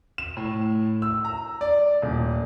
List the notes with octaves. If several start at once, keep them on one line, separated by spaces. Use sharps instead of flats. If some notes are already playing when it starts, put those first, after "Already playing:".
E7
A2
E6
A#5
D5
D#1